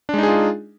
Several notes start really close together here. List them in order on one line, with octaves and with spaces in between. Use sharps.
D4 G#3 D#4 G#4 F4